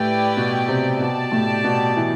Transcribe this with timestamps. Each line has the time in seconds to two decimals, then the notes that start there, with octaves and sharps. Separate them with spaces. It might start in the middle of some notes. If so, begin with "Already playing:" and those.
Already playing: A2 E4 G4 B4 D5 G5
0.37 B2
0.68 C3
1.00 B2 G4 D5 A5
1.32 A2
1.64 B2
1.97 E3